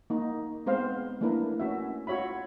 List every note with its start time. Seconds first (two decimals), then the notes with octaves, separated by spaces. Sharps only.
0.10 A#3 D#4
0.66 G#3 B3 C4 C5 F5
1.21 A3 A#3 D4 E4 A#4 B4
1.60 C#4 F#4 E5
2.07 F4 F#4 C#5 E5 B5